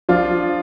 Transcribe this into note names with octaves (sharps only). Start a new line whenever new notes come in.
F3 D4 F4